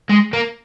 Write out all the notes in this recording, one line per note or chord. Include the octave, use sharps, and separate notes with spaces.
G#3
A#3